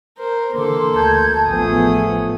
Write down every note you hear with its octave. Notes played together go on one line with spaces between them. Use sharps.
A#4 C5
D3 E3 A#3 A4 C6 D6
D2 A5 G6 G#6
A1 F3 A3 B3 G#4 D#6